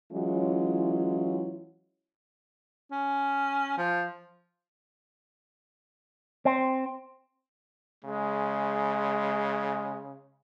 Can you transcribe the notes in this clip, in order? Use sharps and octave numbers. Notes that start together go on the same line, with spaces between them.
E3 F#3 G#3 C#4 E4 F4
C#4
F3
C4
C#3 G#3